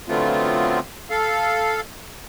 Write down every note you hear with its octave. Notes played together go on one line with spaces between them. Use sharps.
D3 F#3 A3 B3 C4 F4
A4 F5